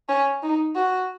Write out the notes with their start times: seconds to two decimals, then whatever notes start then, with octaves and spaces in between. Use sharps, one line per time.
0.09 C#4
0.43 D#4
0.76 F#4